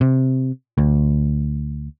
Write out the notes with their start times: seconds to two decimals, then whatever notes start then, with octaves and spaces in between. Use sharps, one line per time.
0.01 C3
0.78 D2